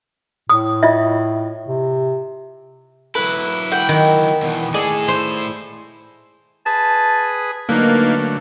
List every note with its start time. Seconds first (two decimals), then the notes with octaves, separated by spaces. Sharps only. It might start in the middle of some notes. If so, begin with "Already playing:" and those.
0.50 A2 D#6
0.83 F4 D#5 E5
1.68 C3
3.15 F#3 E4 B4
3.72 F#5 G5
3.89 D#3
4.42 E2 B2
4.74 A2 G#4 A4 D5 D#5
5.08 C5
6.66 G#4 B4 A5 D#6
7.69 D3 F#3 A3 A#3 D#4 B4